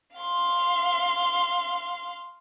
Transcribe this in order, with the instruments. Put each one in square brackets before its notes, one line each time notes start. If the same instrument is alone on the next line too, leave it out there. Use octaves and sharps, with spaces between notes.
[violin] F5 C6